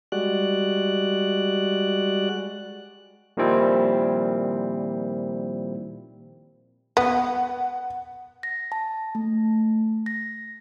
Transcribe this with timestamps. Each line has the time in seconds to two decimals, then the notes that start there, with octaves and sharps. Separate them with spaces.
0.12 G3 G#3 F#4 D5 F#6
3.37 A#2 D#3 F3 G3 C4 E4
6.97 B3 F#5
8.43 A#6
8.72 A5
9.15 A3
10.06 A#6